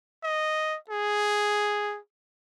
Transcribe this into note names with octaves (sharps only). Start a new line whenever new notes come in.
D#5
G#4